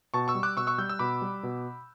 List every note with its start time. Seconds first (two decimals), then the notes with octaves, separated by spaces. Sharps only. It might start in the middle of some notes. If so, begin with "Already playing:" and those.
0.14 B2 A5 C#6
0.28 C#6 E6
0.35 G3
0.43 D6 F#6
0.57 B2 C#6 E6
0.67 C#6 E6
0.78 G3 E6 G6
0.89 E6
0.99 B2 B5 D6
1.22 G3
1.43 B2